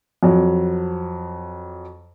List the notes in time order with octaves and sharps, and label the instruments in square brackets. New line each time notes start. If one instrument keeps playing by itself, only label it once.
[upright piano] F2 F#3